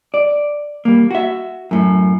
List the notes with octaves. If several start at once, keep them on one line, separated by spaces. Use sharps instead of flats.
D5
G3 A#3
F#4 E5
F#2 A2